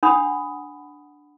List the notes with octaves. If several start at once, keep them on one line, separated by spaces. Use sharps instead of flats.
D4 F#5 B5 D#6